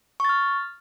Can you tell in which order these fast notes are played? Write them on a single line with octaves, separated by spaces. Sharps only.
C#6 A6 F6